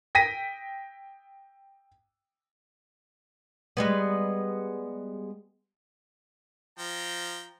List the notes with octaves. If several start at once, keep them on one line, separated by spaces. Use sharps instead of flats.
G5 A#6 B6 D#7
G3 G#3 B3
F3 G5 A#5